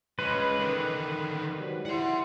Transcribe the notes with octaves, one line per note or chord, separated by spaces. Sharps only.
G#3 C#4 B4
D3 D#3
G#2 F#3 G3
E4 F#5 C6